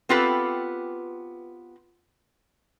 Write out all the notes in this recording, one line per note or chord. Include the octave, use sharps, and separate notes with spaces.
B3 C4 F4 G4 A4 B4